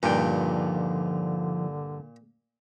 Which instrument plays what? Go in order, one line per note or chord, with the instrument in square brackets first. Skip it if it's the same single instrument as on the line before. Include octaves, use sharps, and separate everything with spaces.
[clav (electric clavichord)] G2 G5 [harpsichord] A#2 [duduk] D3 [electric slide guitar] F3 D#4 F4